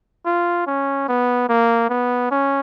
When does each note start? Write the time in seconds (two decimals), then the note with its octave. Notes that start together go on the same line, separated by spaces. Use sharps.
0.26 F4
0.67 C#4
1.08 B3
1.49 A#3
1.89 B3
2.31 C#4